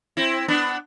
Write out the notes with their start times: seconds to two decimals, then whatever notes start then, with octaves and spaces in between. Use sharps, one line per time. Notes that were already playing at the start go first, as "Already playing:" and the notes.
0.17 C4 E4
0.48 B3 D4